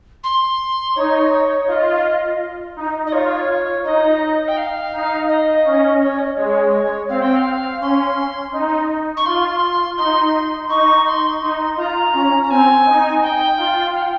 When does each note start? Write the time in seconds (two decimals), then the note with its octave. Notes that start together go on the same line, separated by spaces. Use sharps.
0.23 C6
0.96 D#4 C#5
1.68 F4 D#5
2.76 D#4
3.06 D#5
3.12 F4 C#5
3.84 D#4 D#5
4.48 G5
4.57 F5
4.93 D#4
5.29 D#5
5.64 C#4
6.01 C#5
6.18 D#5
6.37 G#3 C#5
7.09 C4 F5
7.22 G5
7.35 F5
7.81 C#4 C6
8.53 D#4
9.16 C#6
9.25 F4 C6
9.97 D#4 C6
10.69 D#4 C#6
11.06 C6
11.41 D#4
11.77 F4 A#5
12.14 C#4
12.43 A#5
12.50 C4 G#5
12.86 D#4
13.21 G5
13.58 F4
13.94 F5
14.02 G5